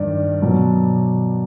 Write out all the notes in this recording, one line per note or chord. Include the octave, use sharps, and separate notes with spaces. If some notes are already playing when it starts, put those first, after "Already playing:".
Already playing: G2 D#3 D5
B2 F#3